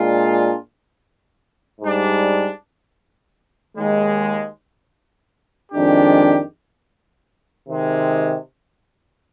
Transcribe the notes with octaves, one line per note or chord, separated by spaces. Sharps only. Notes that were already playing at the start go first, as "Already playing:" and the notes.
Already playing: A#2 G#3 D4 F4
G#2 G3 D4
D#2 D#3 G#3
F2 D#3 G#3 D4 G4
C3 D#3 G#3